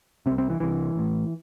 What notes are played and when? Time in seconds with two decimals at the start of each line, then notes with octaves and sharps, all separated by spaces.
0.26 C3 C4
0.31 C2
0.38 C4
0.50 E3
0.60 C2 C3 E3
0.95 A1 A2